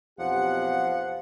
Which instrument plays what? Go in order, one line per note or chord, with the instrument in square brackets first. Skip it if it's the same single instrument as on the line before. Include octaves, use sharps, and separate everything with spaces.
[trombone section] B1 F2 G4 [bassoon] F3 [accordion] F#5